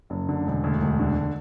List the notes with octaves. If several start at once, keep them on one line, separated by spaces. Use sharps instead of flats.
F#1
D3
E1
D2
E1
D3